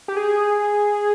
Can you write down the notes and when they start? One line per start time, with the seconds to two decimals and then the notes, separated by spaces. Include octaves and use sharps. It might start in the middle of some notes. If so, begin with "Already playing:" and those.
0.08 G4
0.17 G#4